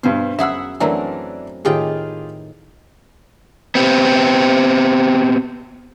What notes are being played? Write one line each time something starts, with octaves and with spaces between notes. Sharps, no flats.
G2 B2 C5
F#2 G#4 E5 F#5 B5 E6
E3 F#3 A3 C4 D4 A#4
A2 D#3 F4 G4 G#4 G5
B3 C4 G4